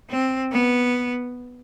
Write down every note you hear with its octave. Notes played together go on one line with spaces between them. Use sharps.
C4
B3